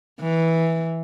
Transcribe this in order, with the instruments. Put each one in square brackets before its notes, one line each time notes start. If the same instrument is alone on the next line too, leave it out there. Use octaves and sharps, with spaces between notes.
[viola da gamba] E3